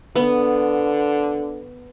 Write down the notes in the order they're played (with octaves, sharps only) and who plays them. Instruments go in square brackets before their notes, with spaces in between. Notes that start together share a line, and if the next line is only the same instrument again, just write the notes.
[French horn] D3 [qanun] B3